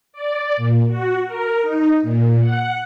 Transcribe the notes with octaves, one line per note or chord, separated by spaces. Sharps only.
D5
A#2
F#4
A#4
D#4
A#2
F#5